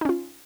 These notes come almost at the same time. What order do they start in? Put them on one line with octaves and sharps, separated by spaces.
D#4 C#4 F4